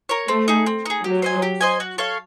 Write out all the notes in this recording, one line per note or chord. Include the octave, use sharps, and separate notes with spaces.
A#4 C#5
A3 C4
D#4 G#4
C4
D#4 G#4
F#3 G4
C5 D#5 G#5
G4
C5 D#5 G#5
F#4
A4 C#5 F5